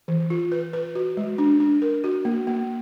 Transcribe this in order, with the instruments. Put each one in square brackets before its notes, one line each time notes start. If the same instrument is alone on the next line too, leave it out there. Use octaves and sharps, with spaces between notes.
[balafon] E3
F4
B4
B4
F#4
G#3
D4
D4
A#4
F#4
A#3
A#3